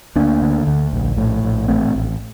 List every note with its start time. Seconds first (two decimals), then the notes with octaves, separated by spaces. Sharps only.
0.16 D2 A#3 D4
0.42 D3
0.67 D2
0.93 A#1
1.17 A2
1.43 A#1
1.68 A1 A3 C4
1.94 A1